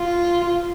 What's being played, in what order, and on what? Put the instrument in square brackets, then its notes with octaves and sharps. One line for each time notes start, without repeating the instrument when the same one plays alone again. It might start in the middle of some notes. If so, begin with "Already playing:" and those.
Already playing: [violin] F4